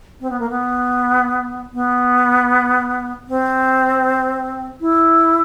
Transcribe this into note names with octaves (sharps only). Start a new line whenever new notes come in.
C4
B3
A#3
B3
B3
C4
E4